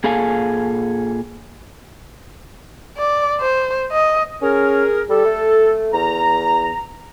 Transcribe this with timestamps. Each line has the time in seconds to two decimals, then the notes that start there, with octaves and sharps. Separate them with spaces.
0.04 A#2 G#4 A4 F5 G#5
2.97 D5
3.41 C5
3.92 D#5
4.42 C#4 G#4 A#4
5.10 G3 A4
5.25 A3
5.93 E2 A#5